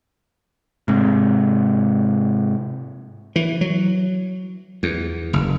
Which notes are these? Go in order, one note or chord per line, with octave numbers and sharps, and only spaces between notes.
G#2 C3
E3
F#3
E2
F#1